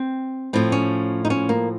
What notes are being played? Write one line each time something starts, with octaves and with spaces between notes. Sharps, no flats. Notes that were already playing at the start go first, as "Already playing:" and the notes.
Already playing: C4
A2 F3 C4
C#4
D#4
C#4
A#3